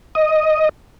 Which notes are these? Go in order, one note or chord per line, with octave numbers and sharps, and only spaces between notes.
D#5